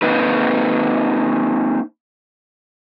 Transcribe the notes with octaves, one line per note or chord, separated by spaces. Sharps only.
A#3 C4 D#4 B4